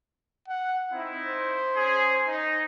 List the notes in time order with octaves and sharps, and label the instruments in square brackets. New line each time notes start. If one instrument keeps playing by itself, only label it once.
[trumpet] F#5
[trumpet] C4 [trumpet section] D#4 E4
[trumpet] C5
[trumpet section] C#4 G#4
D#4